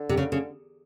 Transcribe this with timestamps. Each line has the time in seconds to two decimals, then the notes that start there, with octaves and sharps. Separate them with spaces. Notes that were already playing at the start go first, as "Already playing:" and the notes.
Already playing: D3
0.09 C3
0.17 C#3
0.32 C#3